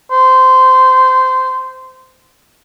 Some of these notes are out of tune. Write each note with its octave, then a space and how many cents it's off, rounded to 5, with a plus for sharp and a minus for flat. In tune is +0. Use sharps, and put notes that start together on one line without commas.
C5 -15